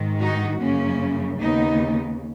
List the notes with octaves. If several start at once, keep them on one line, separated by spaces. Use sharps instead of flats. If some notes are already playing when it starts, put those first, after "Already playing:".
Already playing: G#2 D#3
D#4 F#4
F#2 C#3 A#3 C#4
D#2 C#3 B3 D#4